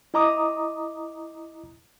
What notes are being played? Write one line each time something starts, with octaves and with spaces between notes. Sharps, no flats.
E4 D#5 A#5 D6 D#6